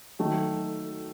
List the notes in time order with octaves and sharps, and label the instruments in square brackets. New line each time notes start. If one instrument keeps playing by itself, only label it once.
[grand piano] D#3 F#3 A3